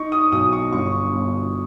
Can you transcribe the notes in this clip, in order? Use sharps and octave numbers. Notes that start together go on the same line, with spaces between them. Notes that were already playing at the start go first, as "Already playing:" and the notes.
Already playing: D#4 C#6
D#6
B1 D#6
C#6
G1 C#6
G1